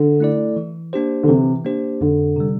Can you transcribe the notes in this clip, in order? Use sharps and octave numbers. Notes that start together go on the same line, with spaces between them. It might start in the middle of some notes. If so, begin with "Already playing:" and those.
Already playing: D3
A3 E4 A4 D5
E3
A#3 D4 G4 C5
D3
C3 E3
A#3 D4 G4 C5
F2 D3
C3 G3